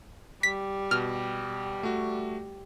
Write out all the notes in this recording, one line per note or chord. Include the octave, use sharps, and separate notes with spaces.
G3 B6
B2 F6
A3 F#4